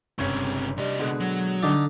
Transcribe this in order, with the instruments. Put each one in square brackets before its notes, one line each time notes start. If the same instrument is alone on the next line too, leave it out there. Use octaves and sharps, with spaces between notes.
[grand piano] G1 C#4 C#5 [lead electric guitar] C#2 C3
[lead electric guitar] C3 D#5 [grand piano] G3 D4
[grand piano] B2 D3 G#3
[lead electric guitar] F#3
[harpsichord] D3 D#4 D5